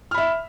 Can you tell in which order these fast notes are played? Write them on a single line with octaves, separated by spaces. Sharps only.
F6 B5 E5